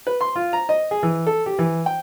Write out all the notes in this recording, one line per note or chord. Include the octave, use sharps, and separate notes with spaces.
B4
C6
F4
A#5
D#5
G#4
E3
A4
G4
E3
G5